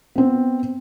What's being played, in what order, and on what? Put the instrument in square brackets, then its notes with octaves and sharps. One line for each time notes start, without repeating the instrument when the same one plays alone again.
[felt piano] B3 C4